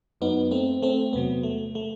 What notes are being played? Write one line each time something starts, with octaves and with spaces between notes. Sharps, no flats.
F#2 F#3 B3 D#4
A3 C4
A3 C4
E2 C3 F#3 B3
A3
A3